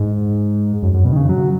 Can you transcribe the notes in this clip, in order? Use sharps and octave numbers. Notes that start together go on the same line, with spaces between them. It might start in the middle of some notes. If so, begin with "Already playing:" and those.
Already playing: G#2
F#2
F#2
B2
D#3
C#3
F#3